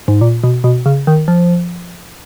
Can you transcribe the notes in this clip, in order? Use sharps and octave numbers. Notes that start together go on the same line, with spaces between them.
G#2
A#2
B2
B2
C#3
D#3
F3